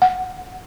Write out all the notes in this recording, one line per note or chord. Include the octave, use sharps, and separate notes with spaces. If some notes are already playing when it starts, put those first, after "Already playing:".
F#5